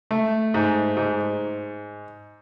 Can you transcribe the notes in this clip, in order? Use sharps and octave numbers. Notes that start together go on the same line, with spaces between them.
A3
G#2
G#2